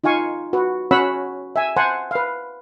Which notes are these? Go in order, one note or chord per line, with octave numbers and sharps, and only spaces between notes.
D#4 F4 F5 G#5 C#6
F#4 B4
C#4 F#4 C#5 F#5 B5 E6
E5 G#5
C5 F#5 G#5 A5 C6
B4 F5